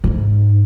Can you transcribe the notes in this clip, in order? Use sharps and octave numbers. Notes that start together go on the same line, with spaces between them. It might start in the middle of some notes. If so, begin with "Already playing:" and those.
G#2